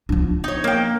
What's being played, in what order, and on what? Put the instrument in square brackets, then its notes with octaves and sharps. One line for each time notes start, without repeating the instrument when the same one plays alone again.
[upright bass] F3 D4
[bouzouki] D#4 C#5
A#3 G5